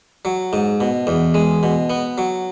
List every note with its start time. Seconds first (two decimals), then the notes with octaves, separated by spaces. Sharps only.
0.25 F#3
0.53 G#2
0.81 B2
1.07 E2
1.34 G#3
1.63 B2
1.90 B3
2.18 F#3